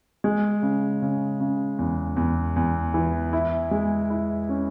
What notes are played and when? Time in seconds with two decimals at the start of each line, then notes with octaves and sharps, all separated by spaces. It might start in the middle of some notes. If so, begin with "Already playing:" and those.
0.24 G#3
0.62 C#3
1.02 C#3
1.40 C#3
1.79 E2
2.17 E2
2.56 E2
2.94 E3
3.33 E4
3.71 G#3
4.10 E4
4.49 C#4